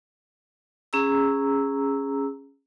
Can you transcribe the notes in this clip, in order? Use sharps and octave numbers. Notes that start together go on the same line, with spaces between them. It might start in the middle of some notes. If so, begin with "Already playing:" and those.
C#4 G#4 A#5 E6